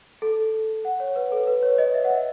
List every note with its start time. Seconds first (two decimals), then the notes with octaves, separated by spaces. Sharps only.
0.22 A4
0.85 F#5
1.00 C#5
1.16 B4
1.32 A4
1.47 B4
1.63 C#5
1.78 D#5
1.94 E5
2.05 F#5
2.10 E5